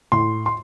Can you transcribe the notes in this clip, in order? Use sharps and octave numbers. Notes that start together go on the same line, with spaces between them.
A2 C6
C6